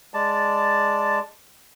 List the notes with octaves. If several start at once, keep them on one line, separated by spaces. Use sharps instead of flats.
G#3 D5 A5